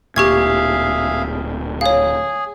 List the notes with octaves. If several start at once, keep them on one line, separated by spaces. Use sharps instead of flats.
D1 A#2 G4 G#4 E5 F5 C#6 G#6
G#4 C#5 F5